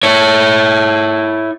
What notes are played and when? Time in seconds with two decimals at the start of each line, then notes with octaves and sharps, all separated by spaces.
0.03 E4 C#5